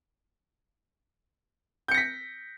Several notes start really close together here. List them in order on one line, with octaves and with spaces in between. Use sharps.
G6 C#7 A#6 B6